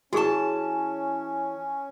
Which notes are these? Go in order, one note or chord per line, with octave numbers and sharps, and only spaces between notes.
E3 C#4 F#4 G#4 A5 C#6